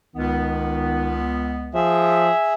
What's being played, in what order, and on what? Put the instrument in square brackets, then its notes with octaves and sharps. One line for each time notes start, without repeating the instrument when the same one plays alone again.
[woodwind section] C#2 B3 [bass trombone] D#3
[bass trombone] F3 [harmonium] G#4 E5